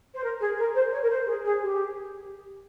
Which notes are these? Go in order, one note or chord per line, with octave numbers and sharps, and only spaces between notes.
C5
A#4
G#4
A#4
C5
C#5
A#4
C5
G#4
G#4
G4